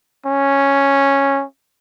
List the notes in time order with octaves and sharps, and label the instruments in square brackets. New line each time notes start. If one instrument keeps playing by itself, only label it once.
[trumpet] C#4